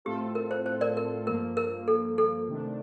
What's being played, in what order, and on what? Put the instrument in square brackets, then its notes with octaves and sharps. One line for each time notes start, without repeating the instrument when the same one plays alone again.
[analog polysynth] A2 A3 C4 F4 A4 [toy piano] G4
[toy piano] A#4
C5
C5
A#4 D5
A#4
[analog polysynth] G2 F3 A#3 [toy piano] A#4
[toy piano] A#4
A4
A4
[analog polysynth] C3 D#3 A3 D4